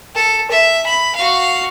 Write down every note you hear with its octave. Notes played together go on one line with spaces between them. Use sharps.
A4
E5
B5
F#4 F5